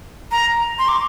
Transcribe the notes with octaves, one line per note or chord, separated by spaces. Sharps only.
A#5
C6
D6